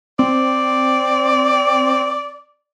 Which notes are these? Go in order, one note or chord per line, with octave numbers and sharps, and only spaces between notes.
C4 D5